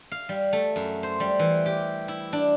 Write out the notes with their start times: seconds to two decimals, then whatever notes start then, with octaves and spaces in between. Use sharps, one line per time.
0.11 F5
0.29 G3
0.53 A3
0.76 F#2
1.03 C5
1.20 G3
1.39 E3
1.66 G4
2.08 E4
2.33 D4